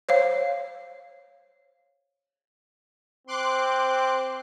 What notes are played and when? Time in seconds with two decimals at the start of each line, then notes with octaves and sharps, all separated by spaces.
0.09 C5 C#5 F5
3.27 C4 C6 D6 F#6